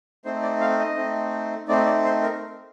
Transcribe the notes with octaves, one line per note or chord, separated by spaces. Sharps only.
A3 C4 D#4 C5
D5
F5
D#5
A3 C4 D#4
A3 C4 D#4 D5
D5
C5
A#4